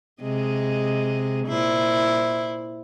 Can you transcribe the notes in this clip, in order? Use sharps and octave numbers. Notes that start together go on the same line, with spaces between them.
C3 G#3 D#5
A#2 E4 C5